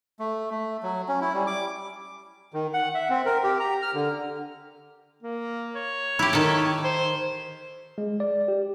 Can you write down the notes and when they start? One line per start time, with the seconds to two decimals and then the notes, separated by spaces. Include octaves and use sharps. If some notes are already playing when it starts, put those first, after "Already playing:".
0.20 A3
0.51 A3
0.83 F#3
1.09 C#4
1.21 E4
1.34 G3
1.47 D6
2.53 D#3
2.74 F#5
2.94 E5
3.10 C4
3.26 A#4
3.44 G4
3.60 A#5
3.82 F6
3.94 D3
5.23 A#3
5.75 C#5
6.19 E4 G4
6.33 D#3 A4
6.84 C5
7.98 G#3
8.20 D5
8.48 G4